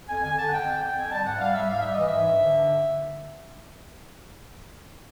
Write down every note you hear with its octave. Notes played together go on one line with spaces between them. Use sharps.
F2 G#5
D3 G#5
D3 A5
F#5
F2 G5
D3
F2 G5
F2 G#5
G3 A5
G#2 F#5
E5
G3 F5
G3 E5
G#2 F5
G3 E5
E3 D#5
G#2 E5
G2
D3